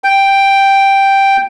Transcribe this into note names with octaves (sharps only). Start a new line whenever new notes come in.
G5